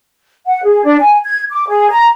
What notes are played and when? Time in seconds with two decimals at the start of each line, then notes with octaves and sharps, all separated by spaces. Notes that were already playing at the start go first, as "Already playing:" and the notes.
0.46 F#5
0.64 G#4
0.83 D4
1.00 G#5
1.25 G#6
1.51 D6
1.68 G#4
1.90 A#5